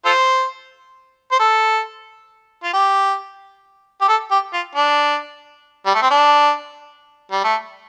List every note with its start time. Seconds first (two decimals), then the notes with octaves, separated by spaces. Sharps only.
0.05 F4 A4 C5
1.32 C5
1.39 A4
2.63 F4
2.73 G4
4.01 G4
4.09 A4
4.31 G4
4.53 F4
4.75 D4
5.86 G3
5.95 A3
6.02 C4
6.10 D4
7.32 G3
7.44 A3